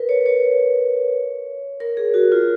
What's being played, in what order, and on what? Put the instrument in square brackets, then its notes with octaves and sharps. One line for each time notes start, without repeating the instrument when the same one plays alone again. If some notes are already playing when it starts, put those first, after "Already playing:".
Already playing: [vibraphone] A#4 B4
C#5
C#5
A#4
G#4
F#4
F4